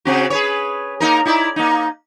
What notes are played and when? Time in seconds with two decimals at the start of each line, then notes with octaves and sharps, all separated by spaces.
0.05 C#3 C4 F#4
0.30 G#4 B4 C#5
1.00 A#3 D#4 A#4
1.25 D#4 E4 D5
1.56 A#3 D#4